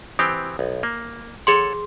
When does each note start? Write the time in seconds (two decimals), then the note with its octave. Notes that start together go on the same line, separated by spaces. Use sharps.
0.19 E3 C4 G4 D#6
0.59 B1
0.83 A#3
1.47 G#4 A4 C#5 F#5 C6